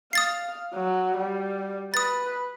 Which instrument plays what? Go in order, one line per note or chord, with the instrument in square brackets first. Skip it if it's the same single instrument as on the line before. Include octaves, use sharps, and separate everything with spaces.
[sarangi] F5 [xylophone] D#6 A6 C7
[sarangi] F#3
G3
[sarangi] B4 [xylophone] D#6 A6